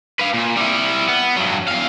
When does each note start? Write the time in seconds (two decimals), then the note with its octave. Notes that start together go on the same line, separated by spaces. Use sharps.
0.19 B4 F5
0.34 A#2
0.57 G3 E4
1.08 B3
1.37 G2 F#3
1.68 E2 F5